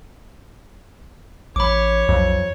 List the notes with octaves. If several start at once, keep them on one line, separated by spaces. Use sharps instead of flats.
A1 C#5 B5 D6
B1 F2